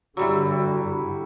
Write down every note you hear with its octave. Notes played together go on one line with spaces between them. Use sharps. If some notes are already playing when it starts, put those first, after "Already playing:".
G2 D3 F#3 G3 E4 F#4